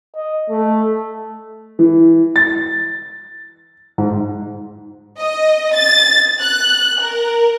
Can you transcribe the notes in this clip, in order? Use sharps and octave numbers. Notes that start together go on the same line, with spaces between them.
D#5
A3
E3
A6
G#2
D#5
A6
F#6
A#4